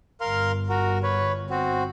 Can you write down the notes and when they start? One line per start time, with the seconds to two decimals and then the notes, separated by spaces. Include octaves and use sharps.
0.21 G1 A#4 F5 C6
0.69 F#4 A#4
1.03 B4 C#5
1.50 C4 F#4